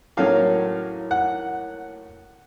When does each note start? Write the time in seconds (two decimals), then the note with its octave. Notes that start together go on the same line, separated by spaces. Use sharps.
0.17 A2 F#3 A#3 C#4 F5
1.11 F#5